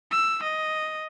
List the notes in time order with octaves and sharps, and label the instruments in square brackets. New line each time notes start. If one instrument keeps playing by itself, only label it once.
[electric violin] E6
D#5